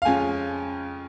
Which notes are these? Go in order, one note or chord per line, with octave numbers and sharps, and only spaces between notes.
F5
F2 C#3 G#3 C#4 F4 G#5